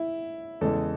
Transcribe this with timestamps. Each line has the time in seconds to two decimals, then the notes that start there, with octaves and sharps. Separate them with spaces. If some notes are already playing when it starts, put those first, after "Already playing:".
Already playing: E4
0.61 E2 C#3 G#3 A4